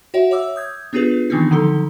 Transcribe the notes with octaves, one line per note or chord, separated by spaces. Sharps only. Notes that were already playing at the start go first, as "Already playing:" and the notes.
F#4 C#5 E5 F#5
C#5 E5 D6 E6
D#6 G6 G#6
B3 D4 F4 G4 G#4 B4
D#3 E3 B3 C4 D4 D#4
D3 F3 F#3 D#4 A4